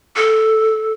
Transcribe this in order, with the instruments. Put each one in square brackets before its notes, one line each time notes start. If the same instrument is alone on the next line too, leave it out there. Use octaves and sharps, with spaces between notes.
[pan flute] A4